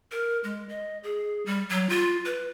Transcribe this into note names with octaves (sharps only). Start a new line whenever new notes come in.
A#4
G#3
D#5
G#4
G3
F#3
F4
B4